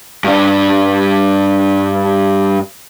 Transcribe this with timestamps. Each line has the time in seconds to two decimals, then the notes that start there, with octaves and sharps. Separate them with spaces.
0.24 G2 D4